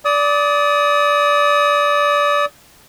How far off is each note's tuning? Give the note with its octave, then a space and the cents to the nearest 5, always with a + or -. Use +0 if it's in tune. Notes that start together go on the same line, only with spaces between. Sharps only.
D5 -15 D#6 +25